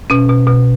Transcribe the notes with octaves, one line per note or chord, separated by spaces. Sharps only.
B2 C#4
B2
B2